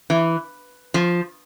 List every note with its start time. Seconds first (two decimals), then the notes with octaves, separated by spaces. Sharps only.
0.10 E3
0.94 F3